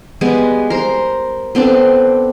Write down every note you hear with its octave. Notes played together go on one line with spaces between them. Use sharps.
G3 G#3 B3
A#4 C5
B3 C4 D4 A4